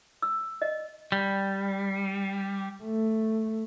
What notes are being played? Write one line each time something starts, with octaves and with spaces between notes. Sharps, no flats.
E6
D#5
G3
A3